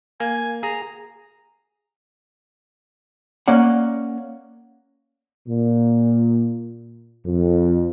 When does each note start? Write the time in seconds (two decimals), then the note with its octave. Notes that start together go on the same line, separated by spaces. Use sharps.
0.20 A#3 G#5
0.63 G#4 A#5
3.48 A#3 C#4 D5 F#5
5.48 A#2
7.25 F2